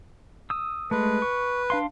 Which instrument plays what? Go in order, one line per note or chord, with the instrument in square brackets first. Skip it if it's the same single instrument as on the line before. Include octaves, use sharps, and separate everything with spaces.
[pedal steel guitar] D#6 E6
[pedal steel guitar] G#3 A3 [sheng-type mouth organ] B4
[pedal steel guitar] C#6
D4 F5 C6